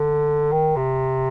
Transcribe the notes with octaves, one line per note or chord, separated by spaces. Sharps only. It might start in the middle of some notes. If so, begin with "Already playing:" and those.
Already playing: D3
D#3
C3